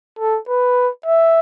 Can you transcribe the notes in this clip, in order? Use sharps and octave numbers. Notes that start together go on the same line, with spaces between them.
A4
B4
E5